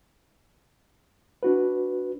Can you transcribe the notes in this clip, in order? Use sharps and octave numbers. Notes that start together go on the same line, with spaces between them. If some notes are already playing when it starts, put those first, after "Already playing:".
D4 F#4 B4